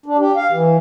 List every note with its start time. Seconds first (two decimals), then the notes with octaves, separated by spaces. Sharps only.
0.06 D4
0.19 G4
0.36 F5
0.52 E3